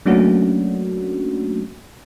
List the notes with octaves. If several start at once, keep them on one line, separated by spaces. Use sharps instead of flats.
F#3 A3 A#3 C#4 D4 F#4